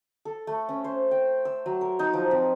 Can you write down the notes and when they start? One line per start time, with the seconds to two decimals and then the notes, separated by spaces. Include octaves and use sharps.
0.25 A4
0.47 A3
0.69 C#4
0.84 C5
1.11 G5
1.45 E6
1.66 F#3
1.81 A#4
1.99 D#4
2.13 F3
2.31 C4